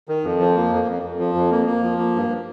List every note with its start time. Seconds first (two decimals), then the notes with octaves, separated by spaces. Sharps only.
0.09 D#3
0.24 F2
0.40 F3
0.57 A#3
0.72 F2
0.87 F2
1.03 F2
1.19 F3
1.35 F2
1.51 A#3
1.66 A#3
1.83 F3
1.98 A#3
2.15 G2